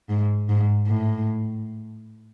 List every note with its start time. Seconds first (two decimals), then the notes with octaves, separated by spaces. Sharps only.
0.09 G#2
0.49 G#2
0.88 A2